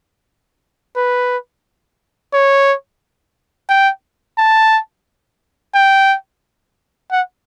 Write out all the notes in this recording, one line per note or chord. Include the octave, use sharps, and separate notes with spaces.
B4
C#5
G5
A5
G5
F#5